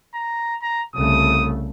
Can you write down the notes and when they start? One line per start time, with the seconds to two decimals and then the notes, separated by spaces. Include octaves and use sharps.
0.14 A#5
0.62 A#5
0.96 C2 C#3 A3 D#6